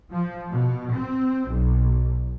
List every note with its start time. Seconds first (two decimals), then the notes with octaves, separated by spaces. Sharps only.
0.12 F3
0.51 B2
0.94 C4
1.51 B1